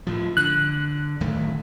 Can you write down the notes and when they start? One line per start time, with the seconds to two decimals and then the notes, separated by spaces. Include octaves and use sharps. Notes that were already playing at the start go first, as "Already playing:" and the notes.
0.07 A2 F3
0.37 D3 F#6
1.21 D1 D#3 A3